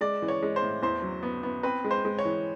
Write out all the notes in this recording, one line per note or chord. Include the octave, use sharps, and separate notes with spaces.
G#3 D5
E3
C#5
G#3
C5
A2
E2 C5
F#3
B3
B3
C4 B4
G#3
C5
G#3
C#5
E3